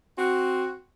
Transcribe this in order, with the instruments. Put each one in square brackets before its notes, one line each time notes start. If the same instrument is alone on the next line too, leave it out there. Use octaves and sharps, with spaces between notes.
[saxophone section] C4 F#4